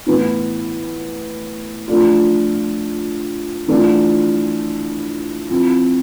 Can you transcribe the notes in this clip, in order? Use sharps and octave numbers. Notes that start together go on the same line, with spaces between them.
A2 E3 B3
F3 A3 D4 F4
E3 A3 D4 F4
F3 C4 E4